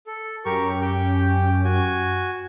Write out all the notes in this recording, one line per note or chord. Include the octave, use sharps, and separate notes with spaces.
A4
F#2 C#4 G4 A#4 C#6
G4 G5
F#4 G#5